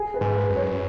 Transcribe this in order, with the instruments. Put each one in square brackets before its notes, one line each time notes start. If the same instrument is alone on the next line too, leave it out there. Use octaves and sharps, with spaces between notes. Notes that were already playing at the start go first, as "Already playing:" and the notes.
Already playing: [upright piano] G#4
B4
[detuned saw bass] G#2
[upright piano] B4
[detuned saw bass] F#2
[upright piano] C#5